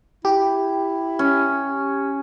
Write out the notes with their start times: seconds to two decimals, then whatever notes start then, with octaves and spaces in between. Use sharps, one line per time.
0.25 E4 G4
1.19 C#4